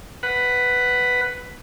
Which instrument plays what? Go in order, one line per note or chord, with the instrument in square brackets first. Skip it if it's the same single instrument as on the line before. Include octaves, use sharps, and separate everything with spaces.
[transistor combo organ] B4 F#5